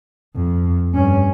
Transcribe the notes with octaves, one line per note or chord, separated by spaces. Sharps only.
F2
G2 C#4